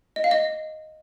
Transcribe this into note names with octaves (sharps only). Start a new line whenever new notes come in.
D#5
F5
D#5